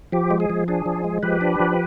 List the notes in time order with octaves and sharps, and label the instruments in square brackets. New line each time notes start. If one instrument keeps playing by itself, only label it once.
[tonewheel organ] F3 G4
G#3
G#4
F3
D4 G#4
F3
G#3
F3 G4 B4
D4
F3